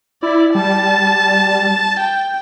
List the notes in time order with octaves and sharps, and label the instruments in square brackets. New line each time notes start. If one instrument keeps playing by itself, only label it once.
[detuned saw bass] E4 [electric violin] D5
[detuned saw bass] G3 [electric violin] A5
[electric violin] G5